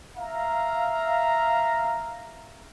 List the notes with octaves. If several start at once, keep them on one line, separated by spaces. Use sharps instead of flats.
E5 F5 A#5